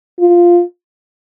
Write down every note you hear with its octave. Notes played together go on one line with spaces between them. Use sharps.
F4